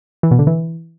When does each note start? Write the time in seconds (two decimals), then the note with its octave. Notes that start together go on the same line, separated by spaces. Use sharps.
0.23 E3
0.31 B2
0.39 D3
0.47 E3